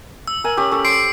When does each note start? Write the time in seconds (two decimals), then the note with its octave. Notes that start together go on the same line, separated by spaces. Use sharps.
0.27 E6
0.44 A#4 G#5
0.57 C#4 G4
0.72 C#4 A4
0.85 C5 C7 D7